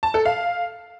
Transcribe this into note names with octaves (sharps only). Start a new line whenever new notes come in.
A5
A4
F5